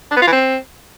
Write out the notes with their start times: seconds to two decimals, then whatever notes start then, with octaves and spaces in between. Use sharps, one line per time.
0.11 D4
0.17 B3
0.22 F4
0.27 E3
0.32 C4